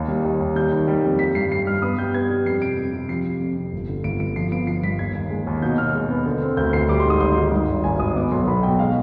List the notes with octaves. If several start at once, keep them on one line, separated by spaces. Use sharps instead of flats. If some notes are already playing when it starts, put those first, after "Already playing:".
Already playing: D#2
G3
D#2
D#2
G3 G6
D#3
G3
F2
G3 B6
G2 C7
G3 C7
G2 F6
B3 D#6
G3 G6
B3 G#6
G3
F2 C7
C3 D7
F2
C3
F3 C7
C3
F2
C3
G1
D3
G1 D7
G1 D7
F3 C7
B3 D7
F3 C7
G2 B6
D#2 G#6
D#2
G#3
D#2
B2 G6
B2 F6
G#3
B3
D3
C4
D2 G6
D2 C7
G3 D6
C6
G#2 D#6
G#1 C6
G#2
G2
G#1
G#1 G#5
G#1 D#6
B3 D6
B1 C6
B1 B5
B2 G5
G#3 F5